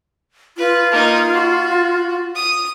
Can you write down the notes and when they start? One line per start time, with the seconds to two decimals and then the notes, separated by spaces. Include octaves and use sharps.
0.58 F4 B4
0.91 A#3 D#4
1.33 F#4
2.35 D#6